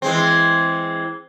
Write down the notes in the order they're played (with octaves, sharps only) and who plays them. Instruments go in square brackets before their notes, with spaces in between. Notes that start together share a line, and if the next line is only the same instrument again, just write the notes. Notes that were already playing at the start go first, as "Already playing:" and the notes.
[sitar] E3 G#3 C4